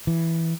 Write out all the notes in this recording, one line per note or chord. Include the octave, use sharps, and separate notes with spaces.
E3